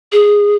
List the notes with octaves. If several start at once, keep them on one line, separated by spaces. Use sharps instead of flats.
G#4